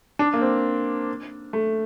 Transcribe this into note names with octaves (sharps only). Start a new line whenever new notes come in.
D4
A#3
C4
A3